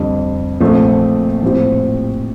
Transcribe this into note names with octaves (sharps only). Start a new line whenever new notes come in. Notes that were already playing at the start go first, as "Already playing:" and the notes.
Already playing: F2 D3 G3
A#1 A#2 F3 A3 C4
A2 F3 C4 G4 C5